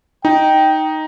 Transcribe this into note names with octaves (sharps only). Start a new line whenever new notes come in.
D#4 G5